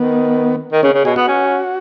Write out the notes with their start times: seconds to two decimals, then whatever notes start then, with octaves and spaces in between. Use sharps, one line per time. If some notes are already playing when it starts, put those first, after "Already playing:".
Already playing: D#3 B3
0.72 D#3
0.83 C#3 C#4
0.94 C#3
1.05 B2 G#4
1.16 B3 F#4
1.27 C#4